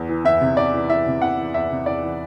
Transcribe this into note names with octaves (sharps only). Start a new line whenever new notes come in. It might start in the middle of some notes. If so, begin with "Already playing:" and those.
Already playing: E2
E3
E2 E5
C3
E2 D5
E3
E2 E5
C3
E2 F#5
E3
E2 E5
C3
E2 D5
E3